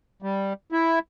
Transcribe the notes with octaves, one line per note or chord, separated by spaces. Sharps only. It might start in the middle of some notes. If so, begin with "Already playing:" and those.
G3
E4